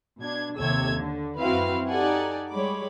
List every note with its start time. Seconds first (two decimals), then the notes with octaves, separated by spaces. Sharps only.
0.19 B2 D4 G#6
0.58 D#2 C3 A4 C#5 E6 G#6
0.94 D3
1.39 F#2 C4 E4 F#4 B4 F5
1.88 D#4 G4 A4 D5 F#5 G#5
2.51 G3 G#3 C#5 B5 D6